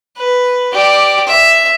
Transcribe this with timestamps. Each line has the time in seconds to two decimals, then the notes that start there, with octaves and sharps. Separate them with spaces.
0.17 B4
0.73 G4 D5
1.28 E5